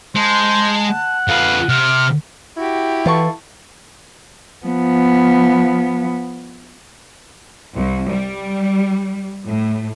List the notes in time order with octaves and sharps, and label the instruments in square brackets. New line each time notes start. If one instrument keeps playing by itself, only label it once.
[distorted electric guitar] G#3 [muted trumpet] C5 [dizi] A5
[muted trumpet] F#5
[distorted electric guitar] F2 B4 [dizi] F5
[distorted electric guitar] C3 [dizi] F6
[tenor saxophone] E4 [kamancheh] F#4 G4
[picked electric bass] E3 [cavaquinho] F4 A4 C#6
[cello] F3 B3
[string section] C2
G3
A2